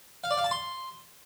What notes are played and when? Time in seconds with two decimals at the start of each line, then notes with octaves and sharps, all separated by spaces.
0.24 F5
0.31 D5
0.37 F5
0.44 A5
0.51 C6